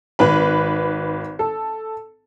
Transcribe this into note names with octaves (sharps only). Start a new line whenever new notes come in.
G#1 B4 B5
A4